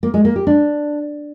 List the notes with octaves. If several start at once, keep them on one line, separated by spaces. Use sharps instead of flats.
A#3
G#3
A#3
G4
D4